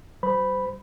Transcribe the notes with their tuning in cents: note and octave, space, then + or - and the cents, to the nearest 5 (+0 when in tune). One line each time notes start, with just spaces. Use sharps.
G3 -40 C5 -30 B5 +0